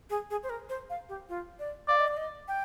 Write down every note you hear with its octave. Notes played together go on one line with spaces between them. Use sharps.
G#4
G#4
C5
A#4
C5
F5
G4
F4
D5
D5 F5
D#5
D5
D#5
G5